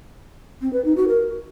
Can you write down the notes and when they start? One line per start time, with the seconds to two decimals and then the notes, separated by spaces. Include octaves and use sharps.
0.61 C4
0.73 B4
0.85 D#4
0.96 F#4
1.08 A#4